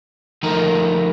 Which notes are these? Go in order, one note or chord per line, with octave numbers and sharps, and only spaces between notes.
F3 A3 D#4 A#4